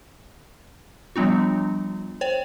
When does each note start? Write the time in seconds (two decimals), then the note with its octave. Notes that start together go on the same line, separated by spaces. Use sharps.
1.16 F3 G3 B3 D4 F4
2.21 C5 C#5 G5